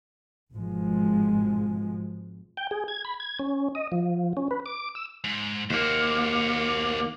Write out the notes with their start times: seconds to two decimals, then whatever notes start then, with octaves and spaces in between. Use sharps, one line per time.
0.52 G#1 B2 F3 G#3
2.57 G5
2.71 G#4
2.88 G#6
3.05 B5
3.20 G#6
3.39 C#4
3.75 D#5
3.92 F3
4.37 C#4
4.51 B4
4.66 D6
4.95 E6
5.24 G#2
5.70 D#2 A#3 F#4 C5